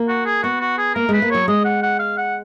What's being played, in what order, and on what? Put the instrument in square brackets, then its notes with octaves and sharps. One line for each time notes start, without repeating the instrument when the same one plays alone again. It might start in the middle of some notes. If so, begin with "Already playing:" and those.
Already playing: [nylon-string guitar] A#3
[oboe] F#4
G#4
[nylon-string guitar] B3 [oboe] F#4
[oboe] F#4
G#4
[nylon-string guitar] A#3 [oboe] A#4
[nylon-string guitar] G#3 [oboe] B4
[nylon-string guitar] A#3
[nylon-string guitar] F#3 [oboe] C#5
[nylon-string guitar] G#3 [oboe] D#5
[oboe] F#5
F#5
F5
F#5